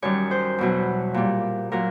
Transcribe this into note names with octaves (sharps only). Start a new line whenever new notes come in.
F#2 D#3 G3 C#5
C5
E2 B2 F#3
A#2 G3
A#2 F#3 A#4